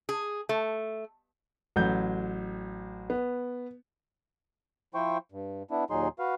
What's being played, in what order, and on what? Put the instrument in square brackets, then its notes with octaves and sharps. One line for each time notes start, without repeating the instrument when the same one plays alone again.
[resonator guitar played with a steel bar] G#4
A3
[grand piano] A1 F#3 G6
B3
[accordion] F3 E4 C5 G5 C#6
G2
B3 D4 E4
D#2 A#2 F#3 D#4 G#4 C6
F#4 B4 F5